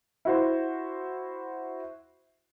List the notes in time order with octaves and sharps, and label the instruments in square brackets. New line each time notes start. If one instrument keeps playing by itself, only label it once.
[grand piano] E4 F#4 C5